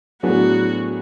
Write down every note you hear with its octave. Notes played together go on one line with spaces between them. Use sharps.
A2 F#3 B3 D4 F#4 G#4